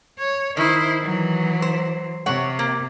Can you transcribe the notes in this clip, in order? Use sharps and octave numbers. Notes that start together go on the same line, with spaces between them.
C#5
D#3 D#4 E4 C5
E3 F#3
C5
C3 C#5 F#5
A#3